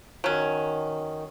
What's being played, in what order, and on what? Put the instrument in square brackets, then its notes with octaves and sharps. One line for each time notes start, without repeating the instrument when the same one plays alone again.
[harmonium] D#3 [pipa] F#3 C#4